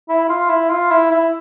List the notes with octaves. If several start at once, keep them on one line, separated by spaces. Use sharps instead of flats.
E4
F4
E4
F4
E4
E4